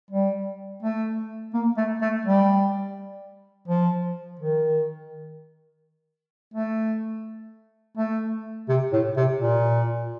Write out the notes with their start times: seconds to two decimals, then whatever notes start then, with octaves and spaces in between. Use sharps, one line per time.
0.11 G3
0.83 A3
1.54 A#3
1.77 A3
2.01 A3
2.25 G3
3.68 F3
4.39 D#3
6.54 A3
7.97 A3
8.69 C3
8.93 A2
9.17 C3
9.40 A#2